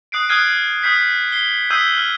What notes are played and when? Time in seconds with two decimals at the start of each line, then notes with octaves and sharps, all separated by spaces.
0.12 D#6 F#6 C7 D7
0.29 D#6 F6 F#6 G#6 C7 D#7
0.83 D#6 F6 G6 B6 C7
1.32 C7 G7
1.71 D#6 E6 G6 B6 C7 D#7
1.98 F6